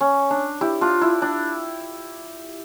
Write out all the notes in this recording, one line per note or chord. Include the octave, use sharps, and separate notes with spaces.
C#4
D4
E4 G4
D4 F4
E4
D4